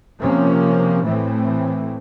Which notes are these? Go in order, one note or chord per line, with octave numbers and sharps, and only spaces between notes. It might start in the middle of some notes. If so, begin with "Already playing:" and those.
C3 F3 A#3 C#4
A2 E3 A3 C4